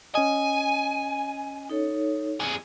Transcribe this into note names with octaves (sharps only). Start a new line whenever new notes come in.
C#4 D#5 G#5
D#4 A4 C#5
F2 G#4